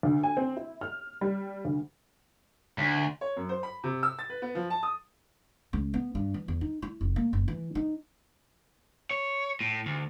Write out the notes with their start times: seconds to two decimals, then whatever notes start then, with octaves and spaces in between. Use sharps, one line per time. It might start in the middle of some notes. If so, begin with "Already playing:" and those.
0.03 D2
0.23 G#5
0.37 C4
0.57 E4
0.81 F6
1.21 G3
1.65 D2
2.78 D2
3.21 C#5
3.37 F#2
3.49 C5
3.63 B5
3.84 C3
4.03 E6
4.19 A6
4.30 B4
4.42 B3
4.55 F3
4.70 A5
4.83 D#6
5.73 C#2
5.94 B3
6.15 G2
6.34 E3
6.48 E2
6.61 D#4
6.82 E4
7.01 F1
7.16 A#3
7.33 F#1
7.48 E3
7.75 D#4
9.11 C#5
9.61 A2
9.86 D2